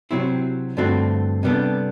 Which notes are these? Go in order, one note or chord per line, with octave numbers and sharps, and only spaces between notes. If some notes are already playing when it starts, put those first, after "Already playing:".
C3 F#3 C4 E4
G2 D3 A3 C4 F#4
C3 G3 B3 D4 A4